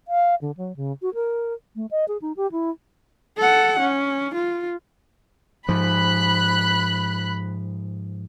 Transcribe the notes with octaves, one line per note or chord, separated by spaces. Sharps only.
F5
D3
F#3
C#3
F#4
A#4
A3
D#5
G#4
D#4
G4
E4
A4 F#5
C#4
F4
G#2 F3 B5 F#6